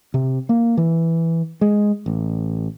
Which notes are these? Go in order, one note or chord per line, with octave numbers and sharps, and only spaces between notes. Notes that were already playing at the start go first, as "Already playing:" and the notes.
C3
A#3
E3
G#3
A1